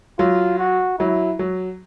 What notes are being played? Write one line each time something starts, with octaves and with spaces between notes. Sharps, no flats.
F#3 F4
F#4
F#3 E4
F#3